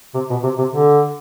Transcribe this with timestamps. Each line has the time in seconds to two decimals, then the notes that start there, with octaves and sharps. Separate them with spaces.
0.14 C3
0.30 B2
0.43 C3
0.58 C3
0.73 D3